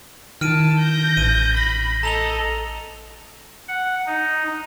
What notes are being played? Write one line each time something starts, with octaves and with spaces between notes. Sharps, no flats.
D#3 E4 A5 F6 D7 D#7
G6 A#6
A1 D#7
B5 A#6
A4 D#5 A#5 F7 G7
F#5
D#4